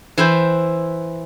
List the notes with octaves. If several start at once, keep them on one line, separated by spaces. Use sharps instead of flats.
E3 E4 C5 G5